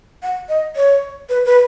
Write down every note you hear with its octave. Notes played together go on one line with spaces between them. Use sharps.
F#5
D#5
C#5
B4
B4